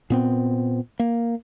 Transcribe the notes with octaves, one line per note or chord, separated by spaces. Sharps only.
A#2 B3 C4
A#3